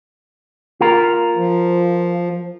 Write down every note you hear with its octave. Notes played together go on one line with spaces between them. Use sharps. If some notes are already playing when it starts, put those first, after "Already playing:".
F4 A#4
F3